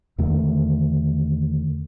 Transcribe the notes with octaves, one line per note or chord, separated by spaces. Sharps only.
E2 D3 D#3 A3